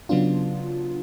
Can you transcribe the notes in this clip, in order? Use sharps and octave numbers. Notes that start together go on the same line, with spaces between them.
C#3 F#3 B3 D4 F4